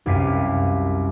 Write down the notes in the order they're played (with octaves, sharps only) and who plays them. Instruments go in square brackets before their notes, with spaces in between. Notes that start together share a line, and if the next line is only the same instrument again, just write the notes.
[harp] C2 F#2 G4 F5 B6 D#7